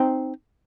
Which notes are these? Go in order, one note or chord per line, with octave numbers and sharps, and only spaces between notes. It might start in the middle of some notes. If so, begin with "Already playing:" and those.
Already playing: C4 D#4